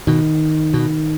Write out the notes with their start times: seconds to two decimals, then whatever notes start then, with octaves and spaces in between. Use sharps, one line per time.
0.07 B2 D#3
0.74 B2